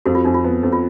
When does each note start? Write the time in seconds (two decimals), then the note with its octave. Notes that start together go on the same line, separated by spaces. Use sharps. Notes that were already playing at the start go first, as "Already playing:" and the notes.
0.06 F2 F#4
0.15 F4
0.25 F2 D#4
0.34 F4
0.44 B3
0.63 F2
0.72 F4